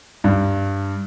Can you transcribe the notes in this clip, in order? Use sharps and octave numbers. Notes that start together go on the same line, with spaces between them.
G2